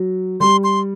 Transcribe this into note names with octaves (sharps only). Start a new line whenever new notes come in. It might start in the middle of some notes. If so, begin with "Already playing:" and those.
Already playing: F#3
G3 C6
C6